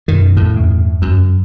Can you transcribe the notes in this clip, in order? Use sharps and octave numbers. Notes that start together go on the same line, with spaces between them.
F#2 B2 D#3
F2 A2
E2 G2 C#3
F#2